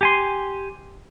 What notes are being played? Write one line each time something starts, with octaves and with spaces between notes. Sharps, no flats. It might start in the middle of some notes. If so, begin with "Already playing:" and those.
G4 G#5 C6